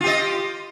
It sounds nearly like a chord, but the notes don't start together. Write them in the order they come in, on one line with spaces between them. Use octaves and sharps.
F4 G4 D#5